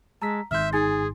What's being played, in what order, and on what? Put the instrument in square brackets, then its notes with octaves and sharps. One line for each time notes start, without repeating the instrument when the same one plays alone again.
[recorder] G#3 [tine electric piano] A5 E6 B6 [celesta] A#5
[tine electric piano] G#1 G#2 C6 [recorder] E5 [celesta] F6 G6
[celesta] D#4 G#5 A6 [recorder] G#4